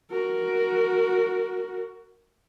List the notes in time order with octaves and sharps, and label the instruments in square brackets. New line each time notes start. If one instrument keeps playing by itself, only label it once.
[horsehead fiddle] F#4 A#4